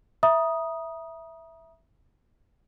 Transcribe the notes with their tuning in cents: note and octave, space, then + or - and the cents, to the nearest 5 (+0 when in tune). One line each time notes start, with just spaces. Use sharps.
E5 +0 A#5 +40 D#6 +0